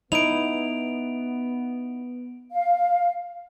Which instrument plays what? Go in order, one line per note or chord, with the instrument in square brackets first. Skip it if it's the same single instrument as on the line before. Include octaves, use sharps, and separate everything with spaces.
[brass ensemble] B3 [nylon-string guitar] D#4 E4 [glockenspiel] D7 F7
[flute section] F5